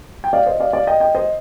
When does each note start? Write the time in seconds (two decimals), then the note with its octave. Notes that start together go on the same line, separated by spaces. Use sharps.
0.24 G5
0.33 D5 F5
0.46 C5 D#5
0.60 D5 F5
0.73 D5 F5
0.87 D#5 G5
1.00 D#5 G5
1.15 C5 D#5